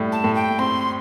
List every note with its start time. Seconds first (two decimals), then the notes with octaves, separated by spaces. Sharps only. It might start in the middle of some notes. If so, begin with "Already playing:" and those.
Already playing: A2 G3
0.12 A5
0.24 A2
0.35 G5
0.59 C4 C6